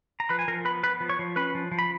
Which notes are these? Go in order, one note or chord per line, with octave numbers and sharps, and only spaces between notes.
A#5
F3 B4 B5
G#5
F3 A#4 A#5
B3 B4 B5
B3 B4 B5
F3
C#5 C#6
F3
C#4 B4 B5
F3
F3
B5